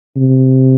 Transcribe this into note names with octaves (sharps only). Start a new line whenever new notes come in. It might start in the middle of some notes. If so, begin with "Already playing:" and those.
C3